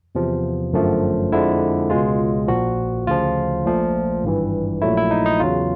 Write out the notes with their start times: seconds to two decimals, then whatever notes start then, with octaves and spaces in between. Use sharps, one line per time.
0.15 E2 C3 F3
0.73 G1 F#2 D3 F3 A3
1.32 F2 D3 F3 G#3 E4
1.90 C#2 B2 G#3 F4
2.48 A#1 A#2 F3 F#4
3.07 D2 C#3 F3 F4
3.65 A#1 A#2 F3 A3
4.23 G#1 G2 E3
4.82 A#1 A#2 F#3 A3 E4
4.97 E4
5.11 D#4
5.26 D#4
5.40 E2 C#3 F#3 F4